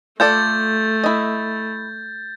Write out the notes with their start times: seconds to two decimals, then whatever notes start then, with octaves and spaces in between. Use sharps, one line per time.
0.20 A3 F4 A4 D5 G6 A6
1.04 E4 D#5